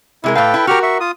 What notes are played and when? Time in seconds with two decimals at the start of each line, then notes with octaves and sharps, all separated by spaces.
0.24 C3 G#3 E4 A#4
0.35 A2 A4 B4 F5 G5
0.54 E4
0.67 F#4 G4 A#4 C#6 F6
0.83 E5 C#6
1.00 F4 D#6